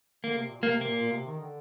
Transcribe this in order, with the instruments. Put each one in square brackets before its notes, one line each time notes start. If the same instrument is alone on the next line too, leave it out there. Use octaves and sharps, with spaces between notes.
[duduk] D3 [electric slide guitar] A#3
[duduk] C3
A#2
[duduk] C3 [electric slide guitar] A#3
[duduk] C3
[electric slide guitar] A#3
[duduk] A#2
A#2
C3
D#3
D3